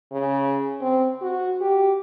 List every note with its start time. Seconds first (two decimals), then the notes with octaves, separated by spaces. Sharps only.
0.12 C#3
0.81 C4
1.22 F#4
1.61 G4